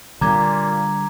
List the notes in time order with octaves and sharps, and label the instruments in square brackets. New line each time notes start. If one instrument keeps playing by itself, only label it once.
[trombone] A#2 [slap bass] D3 G3 [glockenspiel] A#5 D6 G#6